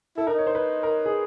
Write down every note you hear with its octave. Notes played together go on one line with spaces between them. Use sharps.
E4 A4
D#4 A#4
C#5
C5
B4
A#4
G#4